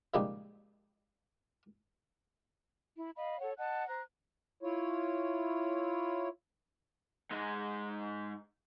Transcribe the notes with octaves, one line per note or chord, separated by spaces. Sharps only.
A#2 C#3 F3 G3 G#3 D#4
E4
D#5 F5 B5
A4 C#5 F#5
D#5 F#5 A5 F#6
C5 A#5 F#6
E4 F4 C#5
G#2 G#3